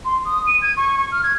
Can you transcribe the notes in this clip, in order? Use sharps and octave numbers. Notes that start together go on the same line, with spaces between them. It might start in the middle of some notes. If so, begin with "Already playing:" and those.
C6
D#6
D#7
G#6
C#6
C#6
F6
G#6